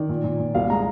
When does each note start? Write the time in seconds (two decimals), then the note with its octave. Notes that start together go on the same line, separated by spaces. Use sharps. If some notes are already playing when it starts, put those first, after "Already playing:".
Already playing: D#3 D5
0.09 A#2
0.24 A#2
0.39 A#2
0.55 C2 F5
0.70 G#3 A#5